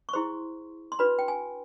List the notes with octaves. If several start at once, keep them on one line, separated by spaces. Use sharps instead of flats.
C#6
E4 G#4 C5 C6
C6
D4 F#4 B4 B5
G5
G#5